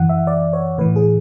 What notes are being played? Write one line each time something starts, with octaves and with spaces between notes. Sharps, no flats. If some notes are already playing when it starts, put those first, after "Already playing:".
Already playing: F#2 E3 F#5
E5
D5
C#5
A2 E3 B4
G#4